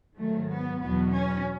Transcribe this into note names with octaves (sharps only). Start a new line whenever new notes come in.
G#2 D#3 F#3 A3
B3
E2 B2 F#3 B3
C#4